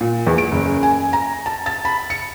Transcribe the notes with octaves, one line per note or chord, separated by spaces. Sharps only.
A#2
E2
D7
F#1
G#5
A#5
A5
A6
B5
C#7